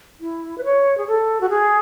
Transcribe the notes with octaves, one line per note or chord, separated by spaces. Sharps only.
E4
B4
C#5
G#4
A4
F#4
G#4